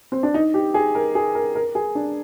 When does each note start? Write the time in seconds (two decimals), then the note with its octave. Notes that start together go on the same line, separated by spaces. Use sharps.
0.12 C4
0.23 D4
0.34 D#4
0.54 G4
0.74 G#4
0.95 A#4
1.15 G#4
1.35 A#4
1.55 A#4
1.75 G#4
1.95 D4